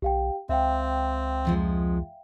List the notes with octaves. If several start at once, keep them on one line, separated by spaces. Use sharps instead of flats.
B1 G4 F5 G5
C#2 C4 E5 F5 G5
F2 F3 G#3